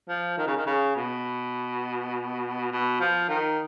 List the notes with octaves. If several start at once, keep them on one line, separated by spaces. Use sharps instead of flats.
F3
D#3
C#3
D#3
C#3
B2
B2
F3
D#3